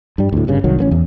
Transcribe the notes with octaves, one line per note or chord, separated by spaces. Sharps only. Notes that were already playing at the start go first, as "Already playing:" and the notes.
G2 G3
D2 A2
G1 G2 C#3
C2 D#3 F#3
A1 A#3 C#4
E2